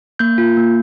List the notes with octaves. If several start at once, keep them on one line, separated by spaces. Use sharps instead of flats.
A#3 G6
F4
A#3